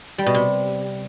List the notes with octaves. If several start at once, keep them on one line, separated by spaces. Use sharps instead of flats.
G3
B2
C3